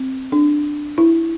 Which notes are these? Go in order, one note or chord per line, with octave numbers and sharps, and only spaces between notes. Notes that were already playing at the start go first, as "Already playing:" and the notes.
Already playing: C4
D4
E4